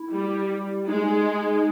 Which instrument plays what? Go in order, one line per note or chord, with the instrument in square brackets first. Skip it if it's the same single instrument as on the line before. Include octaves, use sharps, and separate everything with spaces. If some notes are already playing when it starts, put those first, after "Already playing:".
Already playing: [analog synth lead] E4
[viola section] G3
[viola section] G#3 [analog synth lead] D#4